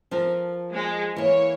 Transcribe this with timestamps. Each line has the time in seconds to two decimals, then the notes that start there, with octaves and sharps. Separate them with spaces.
0.11 F3 A4 A#4
0.73 G#3
1.16 E3 A#3 C#5